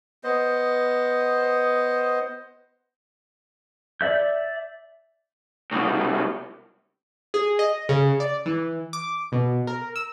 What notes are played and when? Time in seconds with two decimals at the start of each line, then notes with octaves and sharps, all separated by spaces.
0.24 B3 C5 D#5
4.01 D5 E5 G6
5.71 C2 B2
7.34 G#4
7.59 D#5
7.89 C#3
8.20 D5
8.46 E3
8.93 D6
9.32 B2
9.67 A#4
9.96 E6